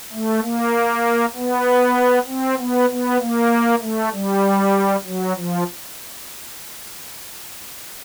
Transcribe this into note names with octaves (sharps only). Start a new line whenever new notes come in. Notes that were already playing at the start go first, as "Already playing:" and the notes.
A3
A#3
B3
C4
B3
B3
A#3
A3
G3
F#3
F3